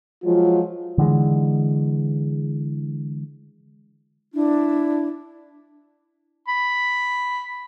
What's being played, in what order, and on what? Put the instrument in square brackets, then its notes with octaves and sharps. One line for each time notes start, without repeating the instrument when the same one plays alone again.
[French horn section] F3 F#3 G#3 F4
[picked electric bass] D3 E3 G#3
[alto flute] D4 [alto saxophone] E4
[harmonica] B5